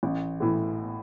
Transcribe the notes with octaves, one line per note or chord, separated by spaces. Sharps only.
A1
A2 E3